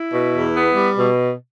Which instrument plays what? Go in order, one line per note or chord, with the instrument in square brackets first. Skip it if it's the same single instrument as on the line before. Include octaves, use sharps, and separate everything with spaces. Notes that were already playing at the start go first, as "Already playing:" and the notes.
Already playing: [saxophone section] E4
B2
E2
B3
G3
B2